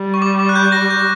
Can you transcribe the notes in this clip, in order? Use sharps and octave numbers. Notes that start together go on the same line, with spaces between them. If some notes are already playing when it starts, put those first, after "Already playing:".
Already playing: G3
C#6
D6
D6
F#6
G6
A#6
G6